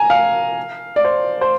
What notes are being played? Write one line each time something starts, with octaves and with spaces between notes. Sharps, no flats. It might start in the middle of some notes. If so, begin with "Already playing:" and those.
Already playing: G#5 A#5
F5
D5
C5
C5